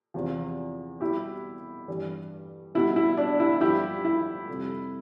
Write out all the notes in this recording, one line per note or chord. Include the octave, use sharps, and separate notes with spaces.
E2 C3 F3
B2 G3 E4 G4
G2 E3 G3
B2 G3 E4
E4
D4
E4
G2 F3 E4 G4
E4
F2 C3 G3